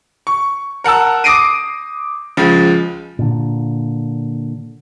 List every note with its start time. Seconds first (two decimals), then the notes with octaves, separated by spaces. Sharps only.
0.27 C#6
0.84 A#4 F#5 A5 E6
1.24 D6 D#6 A#6 C7 D7 D#7
2.37 C#2 F3 G#3
3.19 A#2 D3